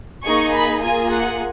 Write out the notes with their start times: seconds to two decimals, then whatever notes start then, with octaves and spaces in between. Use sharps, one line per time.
0.24 A#3 D#4 G#4 C#6
0.53 B5
0.81 A#3 F4 G#4 G#5
1.10 F#5